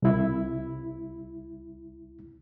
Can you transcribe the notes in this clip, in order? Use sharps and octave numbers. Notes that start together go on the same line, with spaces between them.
C2 E4